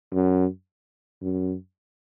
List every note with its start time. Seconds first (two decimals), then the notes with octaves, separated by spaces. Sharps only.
0.13 F#2
1.22 F#2